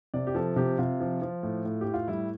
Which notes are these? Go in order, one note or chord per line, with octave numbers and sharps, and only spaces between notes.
C3 D5
G4
F3 A4
C3 G4
C3 F4
F3
F3
A2
A2
A2 G4
F4
G3 E4